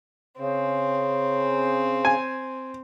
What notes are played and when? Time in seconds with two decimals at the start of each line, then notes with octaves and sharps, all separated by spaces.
0.38 C#3 C4
2.05 G#5